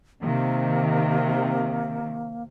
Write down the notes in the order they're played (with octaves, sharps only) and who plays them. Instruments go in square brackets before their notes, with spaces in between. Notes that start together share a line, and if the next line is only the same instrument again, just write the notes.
[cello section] C3 D#3 [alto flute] A#3